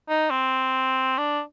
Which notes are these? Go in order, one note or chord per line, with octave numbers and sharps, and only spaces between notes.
D#4
C4
D4